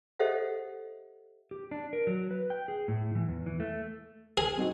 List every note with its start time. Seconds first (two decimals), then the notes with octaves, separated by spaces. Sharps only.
0.19 G4 A4 C5 D#5 E5 F#5
1.51 G4
1.71 D4
1.93 A#4
2.07 F#3
2.31 B4
2.50 G5
2.68 G#4
2.88 A2
3.15 E3
3.28 E2
3.46 E3
3.60 A3
4.37 G#4
4.57 C4 D#4 F#4